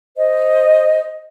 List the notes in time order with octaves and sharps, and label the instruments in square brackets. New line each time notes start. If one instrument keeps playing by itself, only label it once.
[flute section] C5 D#5